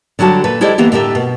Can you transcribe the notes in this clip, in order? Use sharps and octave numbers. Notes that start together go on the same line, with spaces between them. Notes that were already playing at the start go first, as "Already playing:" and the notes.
D3 F#3 G3 F#4 A5
A#2 A4 B4
G#3 E4 G4 A4 C5 D5
D3 E3 A#3 B3 G4
A2 D3 A3 G4 A#4 E5
B2